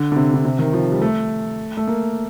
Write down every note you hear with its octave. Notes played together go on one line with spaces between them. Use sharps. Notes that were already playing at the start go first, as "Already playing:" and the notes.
Already playing: D3
D3
C3
D3
C3
D#3
F3
G3
A3
A3
A#3